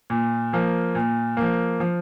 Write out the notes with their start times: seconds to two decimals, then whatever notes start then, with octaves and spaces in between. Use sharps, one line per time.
0.10 A#2
0.53 F3 A#3
0.95 A#2
1.37 F3 A#3
1.80 F3